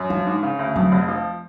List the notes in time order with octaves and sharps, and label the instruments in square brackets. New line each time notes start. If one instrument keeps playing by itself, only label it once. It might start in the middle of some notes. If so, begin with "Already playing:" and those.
Already playing: [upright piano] F#2
[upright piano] F3 [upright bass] F#3
[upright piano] G#2
C#3
D2
[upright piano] F2 [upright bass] F#3
[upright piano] F1
F3